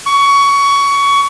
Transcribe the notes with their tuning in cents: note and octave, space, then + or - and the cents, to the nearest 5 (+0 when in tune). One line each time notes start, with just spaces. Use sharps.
C#6 +20